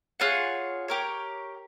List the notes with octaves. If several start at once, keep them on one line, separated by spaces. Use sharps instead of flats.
F4 G#4 C#5 F#5
G4 A#4 C#5